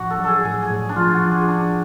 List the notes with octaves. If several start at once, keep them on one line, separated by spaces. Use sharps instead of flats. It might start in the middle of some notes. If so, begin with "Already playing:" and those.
Already playing: A2 F3 D4 F#4
A4
F#3
G#4 A4
A2 G#4
G#4
A2
D4
F3 F4
F#4
F3
G#4
F3 D4